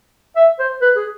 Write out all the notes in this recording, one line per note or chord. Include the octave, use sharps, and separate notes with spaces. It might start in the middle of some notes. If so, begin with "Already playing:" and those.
E5
C5
B4
G#4